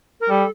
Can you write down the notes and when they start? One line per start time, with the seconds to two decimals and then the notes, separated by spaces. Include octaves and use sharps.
0.21 A#4
0.29 G3 A4